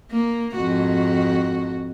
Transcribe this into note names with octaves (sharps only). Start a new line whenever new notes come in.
A#3
F2 G#2 F#4